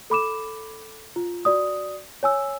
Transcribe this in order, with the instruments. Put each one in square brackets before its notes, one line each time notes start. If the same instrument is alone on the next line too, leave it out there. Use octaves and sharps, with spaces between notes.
[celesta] A4 B5 D6 E7
F4
F#4 D5 D#6
C#5 G#5 E6